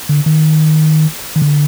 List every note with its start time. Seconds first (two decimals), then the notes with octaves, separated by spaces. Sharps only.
0.09 D3
0.26 D#3
1.36 D#3
1.42 D3